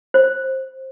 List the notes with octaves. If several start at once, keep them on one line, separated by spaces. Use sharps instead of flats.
C5